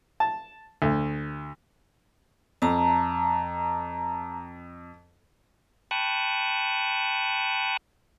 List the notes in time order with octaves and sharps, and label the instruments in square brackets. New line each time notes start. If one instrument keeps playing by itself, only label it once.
[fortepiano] A5
D2
[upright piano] F2 [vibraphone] A5 A#5
[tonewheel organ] G5 A5 B5 C#6 D#6 F#6